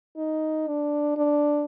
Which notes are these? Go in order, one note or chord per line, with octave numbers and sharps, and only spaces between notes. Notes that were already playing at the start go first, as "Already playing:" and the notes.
D#4
D4
D4